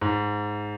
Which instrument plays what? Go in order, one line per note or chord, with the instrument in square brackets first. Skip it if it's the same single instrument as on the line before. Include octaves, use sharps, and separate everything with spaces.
[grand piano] G#2